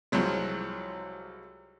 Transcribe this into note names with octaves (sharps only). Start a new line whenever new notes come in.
C2 F3 F#3 G#3